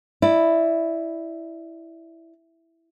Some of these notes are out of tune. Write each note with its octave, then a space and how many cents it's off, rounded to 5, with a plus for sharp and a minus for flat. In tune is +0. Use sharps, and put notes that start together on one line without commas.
E4 +0 D5 +20